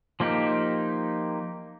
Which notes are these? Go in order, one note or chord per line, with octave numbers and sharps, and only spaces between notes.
F3 A#3 D#4 G4